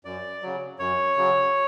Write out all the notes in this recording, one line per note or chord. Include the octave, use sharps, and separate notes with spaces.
F#2 D5
C#3 F#3
F#2 C#5
C#3 F#3